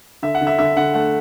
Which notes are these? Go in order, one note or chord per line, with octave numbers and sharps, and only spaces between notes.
D3 E5
F#5
D3
E5
D3 E5
D3 F#5
A3 F#5